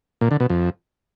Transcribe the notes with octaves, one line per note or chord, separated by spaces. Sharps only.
A#2
D3
B2
F2